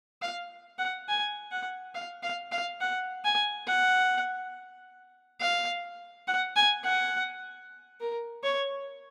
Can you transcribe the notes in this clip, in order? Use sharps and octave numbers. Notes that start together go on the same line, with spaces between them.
F5
F#5
G#5
F#5
F5
F5
F5
F#5
G#5
F#5
F5
F#5
G#5
F#5
A#4
C#5